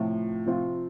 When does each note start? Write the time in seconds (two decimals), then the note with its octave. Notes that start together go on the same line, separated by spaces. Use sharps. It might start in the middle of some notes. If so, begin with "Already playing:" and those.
Already playing: A2 C3 F3 C4 F4
0.46 C3 F3 C4 F4